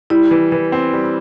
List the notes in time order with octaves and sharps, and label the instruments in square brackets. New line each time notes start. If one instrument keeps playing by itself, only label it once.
[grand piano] G3 [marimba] E4
[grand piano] E3
E3
C4
G3